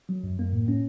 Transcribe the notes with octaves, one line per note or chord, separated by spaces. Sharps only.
F#3
F#2
A#3
A2
C#4